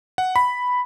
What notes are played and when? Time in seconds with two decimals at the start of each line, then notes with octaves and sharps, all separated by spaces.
0.18 F#5
0.36 B5